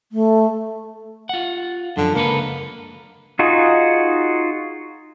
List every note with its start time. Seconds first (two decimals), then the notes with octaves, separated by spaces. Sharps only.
0.12 A3
1.29 F4 F#5
1.97 F#2 D3 F3
2.15 C#2 A#3 A4 B4
3.39 D#4 F4 F#4 G#4